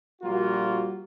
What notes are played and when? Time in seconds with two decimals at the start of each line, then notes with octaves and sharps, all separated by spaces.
0.22 A#1 G3 A#3 F4 F#4